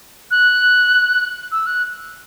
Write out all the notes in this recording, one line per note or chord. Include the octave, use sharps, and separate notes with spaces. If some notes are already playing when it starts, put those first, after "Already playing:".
F#6
E6
F#6